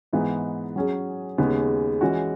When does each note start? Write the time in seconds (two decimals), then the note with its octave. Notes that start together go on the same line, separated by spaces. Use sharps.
0.13 G#2 E3 B3 D#4
0.76 F#3 C#4 G#4
1.38 D#2 C#3 G#3 B3
2.01 E3 G#3 C#4 F#4